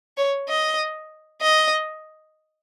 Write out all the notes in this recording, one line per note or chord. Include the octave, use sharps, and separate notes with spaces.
C#5
D#5
D#5